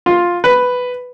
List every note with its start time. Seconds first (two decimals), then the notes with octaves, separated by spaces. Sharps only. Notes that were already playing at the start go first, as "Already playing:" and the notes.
0.06 F4
0.44 B4